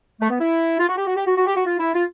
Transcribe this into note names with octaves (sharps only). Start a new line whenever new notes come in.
A3
B3
E4
F4
F#4
G4
F#4
G4
F#4
F#4
G4
F#4
F4
E4
F4